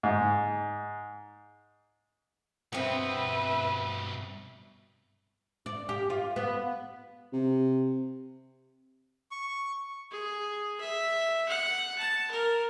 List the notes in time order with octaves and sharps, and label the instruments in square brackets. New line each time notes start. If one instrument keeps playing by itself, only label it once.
[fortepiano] G#2
[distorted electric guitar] G2 B2 [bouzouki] B3 C4 [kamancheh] B4 E5
[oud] D5
G4
F4
B3
[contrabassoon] C3
[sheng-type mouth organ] C#6
[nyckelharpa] G#4
E5
F#5
A5
A#4